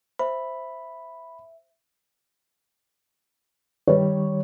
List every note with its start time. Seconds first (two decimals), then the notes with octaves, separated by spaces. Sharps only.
0.19 C5 E5 B5
3.88 D#3 G3 C#5